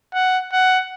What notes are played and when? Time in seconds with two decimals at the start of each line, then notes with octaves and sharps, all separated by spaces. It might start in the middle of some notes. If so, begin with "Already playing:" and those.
0.14 F#5
0.53 F#5